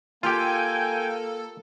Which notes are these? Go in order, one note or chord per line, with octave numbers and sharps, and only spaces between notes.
A#3 F4 G4 A4 G5 G#5